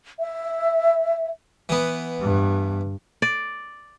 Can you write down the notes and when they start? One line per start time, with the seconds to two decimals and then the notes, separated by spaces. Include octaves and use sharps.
0.20 E5
1.69 E3 B3
2.20 G2
3.22 D5